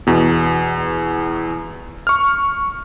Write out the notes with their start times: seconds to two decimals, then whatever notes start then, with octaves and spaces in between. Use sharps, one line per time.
0.07 E2 B2
2.07 C#6 F6